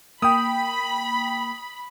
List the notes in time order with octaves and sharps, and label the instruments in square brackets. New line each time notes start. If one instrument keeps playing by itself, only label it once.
[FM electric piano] A#3 G5 [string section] B5 [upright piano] D#6